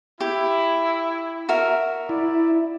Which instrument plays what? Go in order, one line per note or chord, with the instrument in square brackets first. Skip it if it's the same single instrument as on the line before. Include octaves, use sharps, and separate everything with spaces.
[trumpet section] E4 [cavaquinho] G4
[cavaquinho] F#4 A#4 E5
[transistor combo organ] E4 [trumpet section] D5